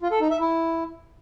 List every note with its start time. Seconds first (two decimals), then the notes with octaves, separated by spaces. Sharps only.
0.02 F4
0.12 A4
0.21 D#4
0.31 E5
0.40 E4